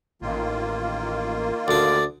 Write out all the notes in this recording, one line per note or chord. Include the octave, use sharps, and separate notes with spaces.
A1 D#3 A#3 F4
D2 D4 D5